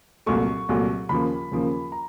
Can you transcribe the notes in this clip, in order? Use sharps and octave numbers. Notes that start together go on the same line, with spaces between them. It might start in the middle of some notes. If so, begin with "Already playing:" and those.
C2 A#2 F#3 A3 C#6
C2 A#2 F#3 A3
D#2 C#3 F3 A#3 B5
D#2 C#3 F3 A#3
A#5